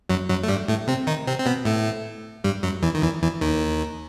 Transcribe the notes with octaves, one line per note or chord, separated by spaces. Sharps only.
F#2 F#3
F#2 F#3
A3
G2 G3
A2 A3
C3 C4
D#3 D#4
C3 C4
C4
B2 B3
A2 A3
G2 G3
F#2 F#3
E2 E3
D#3
E2 E3
E2 E3
D#2 D#3